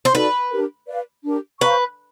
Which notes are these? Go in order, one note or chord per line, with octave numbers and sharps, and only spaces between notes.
C5
D#4 F#4 A4 B4 D5
D4 G4 A#4
B4 D5 F5
D4 G4 A#4
B4 C5 F5 A#5 C#6